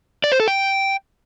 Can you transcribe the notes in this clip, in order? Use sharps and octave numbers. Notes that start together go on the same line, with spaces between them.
D5
C5
A4
G5